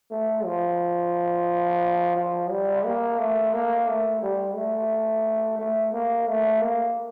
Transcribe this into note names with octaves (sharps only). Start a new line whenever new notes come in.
A3
F3
F3
G3
A#3
A3
A#3
A3
G3
A3
A3
A#3
A3
A#3